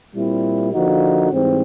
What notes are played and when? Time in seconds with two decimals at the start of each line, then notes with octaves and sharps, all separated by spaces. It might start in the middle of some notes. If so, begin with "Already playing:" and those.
0.14 A#2 G3 C4 E4
0.72 D3 F3 A#3 D#4 F#4
1.30 G#2 E3 G3 C4